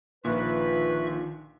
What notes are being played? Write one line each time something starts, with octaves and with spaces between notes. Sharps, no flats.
A#1 A#2 D#3 F4 B4 E5 C#6